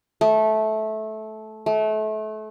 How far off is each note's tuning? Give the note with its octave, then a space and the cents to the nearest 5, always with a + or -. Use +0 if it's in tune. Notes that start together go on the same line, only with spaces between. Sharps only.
A3 -15
A3 -30